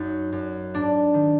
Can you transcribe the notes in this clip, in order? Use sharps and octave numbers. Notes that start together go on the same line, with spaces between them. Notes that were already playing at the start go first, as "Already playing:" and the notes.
Already playing: F#2 D#4
F#2
G#2 D4
D#3